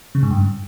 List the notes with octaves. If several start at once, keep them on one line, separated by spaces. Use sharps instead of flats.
C#3
G#2
G2